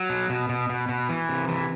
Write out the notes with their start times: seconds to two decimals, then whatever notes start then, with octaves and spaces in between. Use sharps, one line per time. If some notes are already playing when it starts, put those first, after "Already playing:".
Already playing: F#3
0.09 B2
0.29 B2
0.49 B2
0.69 B2
0.89 B2
1.09 E3
1.29 C3
1.49 E3